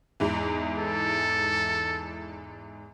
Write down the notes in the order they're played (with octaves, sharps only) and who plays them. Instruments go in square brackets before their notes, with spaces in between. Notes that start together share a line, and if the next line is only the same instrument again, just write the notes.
[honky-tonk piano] E2 G#2 E3
[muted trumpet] A4